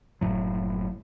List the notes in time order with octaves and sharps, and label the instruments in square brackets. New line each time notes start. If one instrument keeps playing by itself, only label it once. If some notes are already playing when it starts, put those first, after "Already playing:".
[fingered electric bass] F#1 B1 A2 F#3